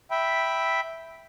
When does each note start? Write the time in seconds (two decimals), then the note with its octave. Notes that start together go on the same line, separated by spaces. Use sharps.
0.11 E5 G5 B5